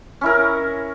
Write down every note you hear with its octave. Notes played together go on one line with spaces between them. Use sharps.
C#4 E4 A#4